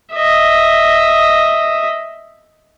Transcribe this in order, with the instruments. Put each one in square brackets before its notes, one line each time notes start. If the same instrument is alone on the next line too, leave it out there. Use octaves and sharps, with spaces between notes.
[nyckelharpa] D#5 E5